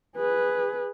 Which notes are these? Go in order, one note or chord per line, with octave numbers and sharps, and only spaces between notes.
G#4 B4